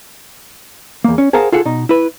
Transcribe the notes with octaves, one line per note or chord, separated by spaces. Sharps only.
E2 A#3
C#4
G#4 A#4 C5 F5 F#5 A5
F4 G#4 A4 F#5
B2 D#4
E4 B4